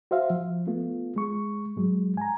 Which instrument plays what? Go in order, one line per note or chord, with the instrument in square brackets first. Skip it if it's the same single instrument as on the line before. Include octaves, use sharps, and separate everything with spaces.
[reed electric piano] F#4 C5 E5 F5
F3
A3 B3 F4
G#3 C#6
G#2 F#3 G#3
G#5 A#5